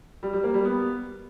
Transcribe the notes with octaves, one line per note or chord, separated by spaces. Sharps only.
G3
G3
A#3
G3
B3